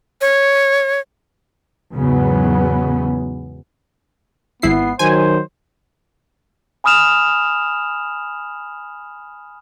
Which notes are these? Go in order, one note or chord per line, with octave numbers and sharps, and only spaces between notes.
C#5
E2 G#2 C#3 F#3 B3
G#1 B3 E4 C7
D#3 F#3 C5 G#5
G#5 B5 D#6 F6 E7 F7